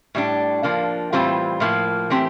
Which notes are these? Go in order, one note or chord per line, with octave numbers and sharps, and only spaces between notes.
A2 G3 D4
F3 A#3 D4
A2 E3 G3 C4 F4
A2 F3 A#3
E3 A3 C4 G4